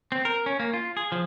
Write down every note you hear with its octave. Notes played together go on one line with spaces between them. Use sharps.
C4
A#4
C#4
A#3
F4
G#4
F3